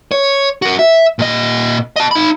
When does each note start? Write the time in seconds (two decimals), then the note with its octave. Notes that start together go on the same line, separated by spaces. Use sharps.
0.12 C#5
0.62 F#4 A#4
0.79 E5
1.19 A#2 D#5
1.96 D#5 A5
2.11 D#4 B5